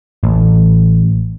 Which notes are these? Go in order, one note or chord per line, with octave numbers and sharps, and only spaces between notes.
A1